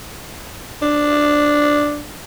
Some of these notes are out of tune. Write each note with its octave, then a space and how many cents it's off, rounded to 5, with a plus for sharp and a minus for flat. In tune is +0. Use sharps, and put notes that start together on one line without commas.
D4 +0